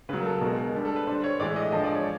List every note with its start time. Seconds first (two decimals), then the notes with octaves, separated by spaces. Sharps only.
0.09 C#3 B4
0.13 F#3
0.20 A#4
0.26 A4
0.41 B2 A#4
0.46 G#3
0.58 A#4
0.74 D3 G3 A4
0.85 A4
0.96 B4
1.07 D3 G3 C5
1.24 C#5
1.39 A2 E3 G#3 D5
1.56 D#5
1.72 D3 F3 G#3 D#5
1.84 D5
1.95 C#5